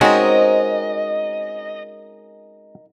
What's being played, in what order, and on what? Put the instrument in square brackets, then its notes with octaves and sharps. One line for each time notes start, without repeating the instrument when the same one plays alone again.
[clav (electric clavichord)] G#3 C#4 F#4 [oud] C4 [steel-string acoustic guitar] D#4 A#4 [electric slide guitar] D#5